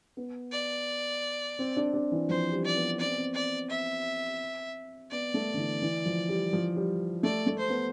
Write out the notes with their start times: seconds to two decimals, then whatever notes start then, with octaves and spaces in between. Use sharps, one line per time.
0.17 B3
0.52 D5
1.59 C4
1.77 D4
1.94 D4
2.12 E3
2.29 F3 C5
2.52 G3
2.65 D5
2.76 B3
2.99 C4 D5
3.09 B3
3.18 C4
3.34 D5
3.70 E5
5.11 B3 D5
5.34 A3
5.54 D3
5.58 E3
5.82 E3
6.05 F3
6.29 G3
6.53 F3
6.76 G3
7.23 A3 D5
7.47 A3
7.58 C5
7.70 B3